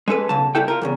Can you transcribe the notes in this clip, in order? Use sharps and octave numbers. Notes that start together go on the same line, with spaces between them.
G#3 C#4 A4 B4
B1 C#3 A5
C2 C3 E4 A4 G5
F4 A#4
E2 A2 C#3